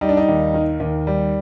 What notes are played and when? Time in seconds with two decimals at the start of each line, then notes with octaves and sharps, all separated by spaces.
0.01 G3 D#4
0.09 D4
0.17 D#4
0.28 D#2
0.54 D#3
0.80 D#2
1.07 G3